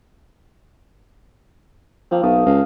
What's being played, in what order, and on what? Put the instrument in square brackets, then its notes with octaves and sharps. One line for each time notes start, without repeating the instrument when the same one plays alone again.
[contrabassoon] F3 [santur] A#3 C4
[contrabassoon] B1 [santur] A3 A5 D#6
[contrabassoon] C#2 [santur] F5